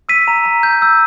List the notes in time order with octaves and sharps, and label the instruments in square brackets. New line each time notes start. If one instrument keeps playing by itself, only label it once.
[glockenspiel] E6 B6 D#7
A#5
A#5
G6
E6